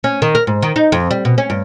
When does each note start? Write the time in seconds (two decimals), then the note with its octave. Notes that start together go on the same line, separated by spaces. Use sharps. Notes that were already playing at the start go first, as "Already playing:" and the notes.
0.04 C#4
0.22 D#3
0.35 A#4
0.47 G#2
0.62 D#3
0.76 D#4
0.92 F2
1.11 G3
1.25 B2
1.38 C#4
1.50 G2